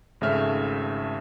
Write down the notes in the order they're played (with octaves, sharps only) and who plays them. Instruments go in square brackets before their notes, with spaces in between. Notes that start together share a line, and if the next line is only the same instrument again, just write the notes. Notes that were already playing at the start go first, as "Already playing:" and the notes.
[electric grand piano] G#1 C#3 A3 E5 F6